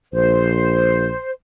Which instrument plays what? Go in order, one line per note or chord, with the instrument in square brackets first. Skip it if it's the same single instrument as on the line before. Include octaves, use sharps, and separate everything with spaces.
[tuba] A#1 [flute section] C5